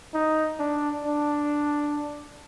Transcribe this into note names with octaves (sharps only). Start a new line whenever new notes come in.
D#4
D4
D4